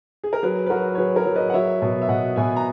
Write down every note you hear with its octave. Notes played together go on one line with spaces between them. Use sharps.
G#4
A#4
F#3 G#4 B4
B4
F#3 F#4 A#4
C#5
F#3 G#4 B4
A#4 C#5
F#3
B4 D#5
F#5
F#3 C#5 E5
B2
E5
B2 D#5 F#5
B2 E5 G#5
A#5